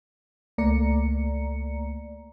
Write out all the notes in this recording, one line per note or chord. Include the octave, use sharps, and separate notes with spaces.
C#2 A3 A#3 D5 A#5 C#7